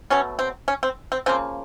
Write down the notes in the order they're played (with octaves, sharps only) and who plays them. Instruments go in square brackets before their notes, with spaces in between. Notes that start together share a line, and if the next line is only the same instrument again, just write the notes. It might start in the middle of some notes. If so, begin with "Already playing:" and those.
[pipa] B2 F#3 A3 C#4
C4
C#4
C4
C4
C#3 F3 A#3 C4